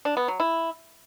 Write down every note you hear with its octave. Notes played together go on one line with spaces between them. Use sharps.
D4
B3
F#3
E4